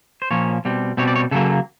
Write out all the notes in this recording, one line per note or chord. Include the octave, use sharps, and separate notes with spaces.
C5
A#2 F3 A#3 C#4 C#5
B2 G3 C4
B2 G3 C4 C#5
D5
C#5
C#3 F#3 A#3 A4